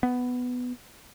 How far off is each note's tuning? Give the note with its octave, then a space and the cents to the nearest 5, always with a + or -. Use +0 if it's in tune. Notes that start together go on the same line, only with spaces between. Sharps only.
B3 +5